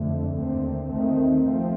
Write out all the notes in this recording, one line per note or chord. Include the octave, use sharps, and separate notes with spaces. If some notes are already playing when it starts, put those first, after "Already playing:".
Already playing: F2 D3 A3
D#2 D3 A3 C4
D#2 D#3 A3 C4
F3 A3 C4